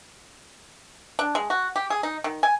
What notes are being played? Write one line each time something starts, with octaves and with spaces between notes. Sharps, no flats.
D4
G#3
F#4
G4
G#4
D#4
D#3
G#5